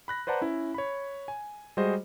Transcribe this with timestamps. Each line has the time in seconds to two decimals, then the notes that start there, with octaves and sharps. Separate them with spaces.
0.08 B5 F#6 A#6
0.27 B4 C5 D5 F#5 A5 A#5
0.41 C#4 E4
0.74 C#5 B5
1.28 G#5
1.77 G3 G#3 F#4 G#4 C5 D#5